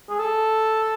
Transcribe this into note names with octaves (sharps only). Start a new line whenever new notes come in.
G#4
A4